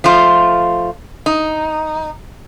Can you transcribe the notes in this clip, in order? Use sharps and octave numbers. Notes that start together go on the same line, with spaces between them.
F3 A3 F4
D#4